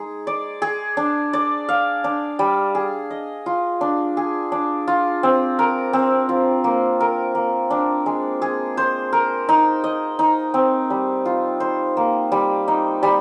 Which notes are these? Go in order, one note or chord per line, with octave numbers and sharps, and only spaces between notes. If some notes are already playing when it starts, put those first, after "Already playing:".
Already playing: G#3 D#4 G#4
D5
G#4
D4
D5
F5
D4
G3
G#4
D#5
F4
D4
G#4
D4
F4
C4
A#4
C4
F4
A#3
A#4
A#3
D4
G#3
G#4
C5
A#4
D#4
D#5
D#4
C4
G3
F4
C5
A#3
G3
D#4
G3